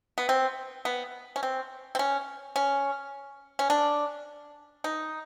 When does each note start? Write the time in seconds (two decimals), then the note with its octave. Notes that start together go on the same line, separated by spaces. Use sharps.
0.18 B3
0.29 C4
0.85 B3
1.36 C#4
1.43 C4
1.95 C4
1.99 C#4
2.56 C#4
3.59 C#4
3.70 D4
4.84 D#4